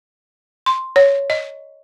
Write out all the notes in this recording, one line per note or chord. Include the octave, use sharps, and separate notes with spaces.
C6
C#5
D#5